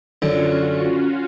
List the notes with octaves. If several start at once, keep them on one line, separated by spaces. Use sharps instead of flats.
F#2 D3 C#4 F4 F#4